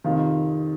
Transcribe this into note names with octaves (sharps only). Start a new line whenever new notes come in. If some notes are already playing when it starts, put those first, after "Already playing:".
F2 C3 D#3 F4